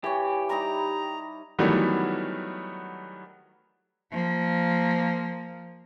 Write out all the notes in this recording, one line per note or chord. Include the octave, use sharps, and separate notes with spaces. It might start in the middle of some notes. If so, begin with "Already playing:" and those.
E3 G4 C#5
G3 D#4 A#5
D#3 E3 F#3 G3 A3 B3
F3 A#3